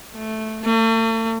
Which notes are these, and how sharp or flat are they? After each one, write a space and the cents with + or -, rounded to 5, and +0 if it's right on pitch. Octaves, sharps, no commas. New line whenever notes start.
A3 -5
A3 +40